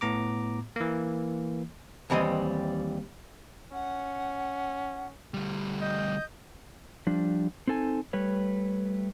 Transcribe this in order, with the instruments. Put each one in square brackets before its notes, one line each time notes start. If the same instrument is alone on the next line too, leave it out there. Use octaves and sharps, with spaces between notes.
[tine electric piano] A2 B3 A#5 D6
E3 A#3
[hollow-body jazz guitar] D#2 E3 F#3 G3 C4 D#5
[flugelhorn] C#4 [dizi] F#5
[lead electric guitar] D2 G3
[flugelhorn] D#5 [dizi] G6
[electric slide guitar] F3 G3 D4
C4 D#4 A4 G#5
G3 A3 B4 C#5